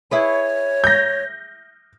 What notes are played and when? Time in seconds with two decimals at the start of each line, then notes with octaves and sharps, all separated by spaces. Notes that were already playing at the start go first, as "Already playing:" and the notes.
0.11 E4 G#4 B4 C#5
0.84 G6 A#6